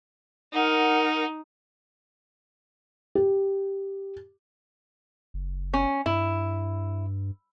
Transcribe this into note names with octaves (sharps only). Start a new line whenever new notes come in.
D#4 A#4 F#5
G4
F#1
C#4
G2 E4